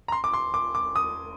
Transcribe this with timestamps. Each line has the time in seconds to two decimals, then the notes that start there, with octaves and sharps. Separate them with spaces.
0.08 A#5
0.12 C6
0.24 D6
0.33 C6
0.54 D6
0.75 D6
0.96 D#6